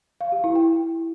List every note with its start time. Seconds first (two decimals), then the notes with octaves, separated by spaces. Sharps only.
0.21 F5
0.32 G4
0.44 E4
0.55 G5